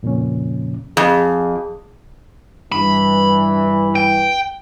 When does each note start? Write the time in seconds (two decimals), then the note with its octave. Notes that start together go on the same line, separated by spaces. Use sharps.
0.03 F2 A#2 C#3 F3 C#4
0.97 F2 G#4
2.72 G2 E3 B5
3.96 G5